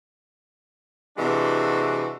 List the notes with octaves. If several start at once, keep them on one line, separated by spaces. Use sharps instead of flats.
C3 E3 G#3 D4 F#4